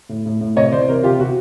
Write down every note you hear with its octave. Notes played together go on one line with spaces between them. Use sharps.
A2
A2
A2
C3 C#5 D#5
E3 C5 D5
C3 A#4 C5
C3 F4 G4
C3 F#4